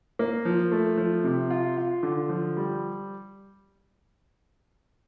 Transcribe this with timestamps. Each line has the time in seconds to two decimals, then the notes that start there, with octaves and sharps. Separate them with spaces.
0.19 A#3
0.45 F3
0.72 A3
0.97 F3
1.24 C3
1.50 F4
1.77 F4
2.03 D3
2.29 F3
2.57 G3